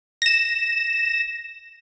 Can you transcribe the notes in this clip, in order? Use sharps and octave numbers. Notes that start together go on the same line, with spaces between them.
A#6 E7